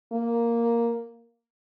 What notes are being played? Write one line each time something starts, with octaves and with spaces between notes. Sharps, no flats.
A#3